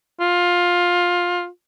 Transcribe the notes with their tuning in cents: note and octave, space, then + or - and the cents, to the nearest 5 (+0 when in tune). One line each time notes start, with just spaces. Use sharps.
F4 +15